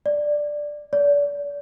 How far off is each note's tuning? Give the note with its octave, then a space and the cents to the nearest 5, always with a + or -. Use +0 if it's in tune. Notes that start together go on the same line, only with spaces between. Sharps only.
D5 +5
D5 -35